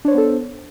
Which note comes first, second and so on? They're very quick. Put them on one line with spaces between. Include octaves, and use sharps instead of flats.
D4 C#5 C5 B3 A4